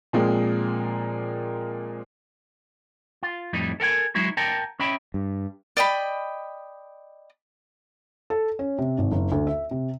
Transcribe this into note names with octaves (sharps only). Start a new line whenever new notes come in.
A#2 F3 G#3 A#3 C4
F4
F2 A2 G3 D#4
A4 A#4 F#5 G#5
F#3 G#3 D#4 E4 F#4
A#4 F#5 G5 A5 A#5
C#4 D#5 E5 G5 B5
G2
D5 D#5 G5 B5
A4
C#4
C3
G#1
F#1
D2
E5
C3